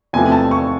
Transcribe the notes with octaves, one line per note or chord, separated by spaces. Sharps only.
E2 C3 F3 A3 G#5
A5
C#6